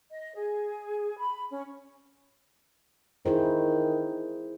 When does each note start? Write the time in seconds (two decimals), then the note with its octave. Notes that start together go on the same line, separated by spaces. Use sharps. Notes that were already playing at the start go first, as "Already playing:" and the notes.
0.11 D#5
0.34 G#4
1.18 B5
1.50 C#4
3.26 D#3 E4 G#4 C5